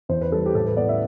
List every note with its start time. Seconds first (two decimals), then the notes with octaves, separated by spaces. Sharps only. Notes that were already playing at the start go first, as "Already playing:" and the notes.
0.09 E2 C5
0.21 B4
0.32 G3 A4
0.46 G4
0.55 A2 A4
0.66 B4
0.77 B3 D5
0.89 E5